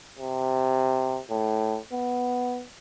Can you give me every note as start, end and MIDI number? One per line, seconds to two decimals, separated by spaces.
0.19 1.19 48
1.30 1.78 45
1.93 2.64 59